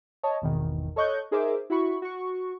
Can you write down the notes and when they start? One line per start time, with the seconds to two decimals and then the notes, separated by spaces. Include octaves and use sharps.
0.23 C#5 D#5 A5
0.42 G#1 E2 B2 D#3
0.96 A4 C#5 D#5 C#6 F#6 G6
1.31 D#4 G#4 A#4 C5 E5 D6
1.70 E4 F#4 B5 C#6
2.02 F#4 C#6